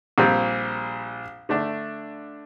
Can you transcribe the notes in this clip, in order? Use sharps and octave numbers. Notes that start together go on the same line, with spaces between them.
A#1 A#2 G3 C4
D3 A3 D4